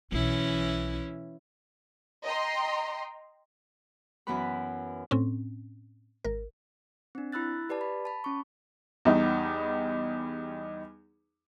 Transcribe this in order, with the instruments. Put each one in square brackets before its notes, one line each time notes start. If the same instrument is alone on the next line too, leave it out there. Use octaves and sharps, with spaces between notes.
[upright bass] B1 [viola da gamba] E3 C#4 E4
[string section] D#5 G5 A#5 C6
[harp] F#2 E3 B3 E4 B4 B5
[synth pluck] A2 C4 C#4
G#1 A#4
[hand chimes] C4 D4
E4 B5 E6 F#6 A6
G4 B4 D5 A5
B5
A5 B5
C#4 C#6
[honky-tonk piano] E2 G3 D#4